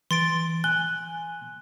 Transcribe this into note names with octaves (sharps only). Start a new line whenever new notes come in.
E3 C6 A6 D7
G#5 F#6 G7